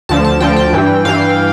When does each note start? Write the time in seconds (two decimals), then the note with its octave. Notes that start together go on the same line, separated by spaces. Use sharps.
0.09 D2 D3 F3 A5
0.25 A5
0.40 D2 D3 F3 G5
0.57 G5
0.73 G2 E3
1.05 G2 E3 F5